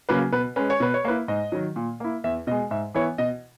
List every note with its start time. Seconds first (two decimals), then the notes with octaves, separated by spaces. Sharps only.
0.09 C#3 F#3 A#3 B4
0.32 B2 B4
0.56 G#3 C#4 B4
0.70 C#5
0.80 B2 B4
0.94 C#5
1.05 A#3 E4 B4
1.28 G#2 D#5
1.52 D#3 F#3
1.76 A#2
2.00 A#3 E4
2.24 E2 E5
2.47 B2 D#5
2.51 G#3
2.71 G#2 E5
2.95 E3 B3 E4 C#5
3.18 B2 D#5